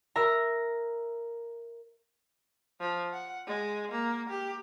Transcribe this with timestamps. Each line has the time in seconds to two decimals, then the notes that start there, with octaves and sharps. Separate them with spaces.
0.16 A#4 E5 A#5
2.80 F3
3.13 F#5
3.47 G#3
3.91 A#3
4.29 G4